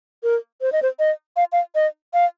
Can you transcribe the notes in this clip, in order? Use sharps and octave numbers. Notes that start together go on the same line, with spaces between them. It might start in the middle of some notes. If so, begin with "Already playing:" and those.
A#4
C5
D#5
C5
D#5
F5
F5
D#5
F5